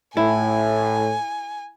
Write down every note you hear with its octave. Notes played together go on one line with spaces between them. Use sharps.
A2 E4 G#5